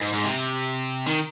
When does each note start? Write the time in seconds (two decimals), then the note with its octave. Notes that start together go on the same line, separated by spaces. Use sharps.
0.02 G#2
0.13 G#2
0.24 C3
1.06 D#3